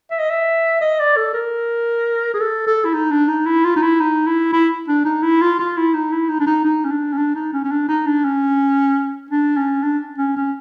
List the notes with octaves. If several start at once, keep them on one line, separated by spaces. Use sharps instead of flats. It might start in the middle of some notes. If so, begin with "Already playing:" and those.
E5
D#5
E5
D#5
D5
A4
A#4
G#4
A4
A4
E4
D#4
D4
D#4
E4
F4
D#4
E4
D#4
E4
E4
D4
D#4
E4
F4
F4
E4
D#4
E4
D#4
D4
D#4
D#4
C#4
D4
C#4
D4
D#4
C#4
C#4
D4
D#4
D4
C#4
D4
C#4
D4
C#4
C#4